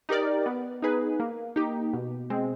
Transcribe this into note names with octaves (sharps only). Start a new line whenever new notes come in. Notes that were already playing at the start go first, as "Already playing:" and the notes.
D#4 G4 A#4 D5
B3
D#4 G#4 B4
A#3
D#4 G4
B2
G#3 C4